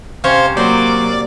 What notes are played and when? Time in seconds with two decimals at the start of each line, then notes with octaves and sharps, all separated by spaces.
0.24 C3 C#4 C5 C#5 F5
0.57 F#3 A#3 C5 D5 D6